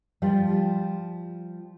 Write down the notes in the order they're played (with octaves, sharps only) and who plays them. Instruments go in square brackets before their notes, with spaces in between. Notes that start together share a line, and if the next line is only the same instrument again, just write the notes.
[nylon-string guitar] F3 G3 F4